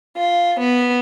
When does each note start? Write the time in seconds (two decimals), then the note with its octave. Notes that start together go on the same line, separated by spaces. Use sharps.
0.16 F4
0.61 B3